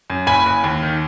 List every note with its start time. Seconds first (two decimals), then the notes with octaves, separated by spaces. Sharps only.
0.10 F#2
0.27 F#1 G#5 B5
0.46 F#1
0.64 D#2
0.82 D#3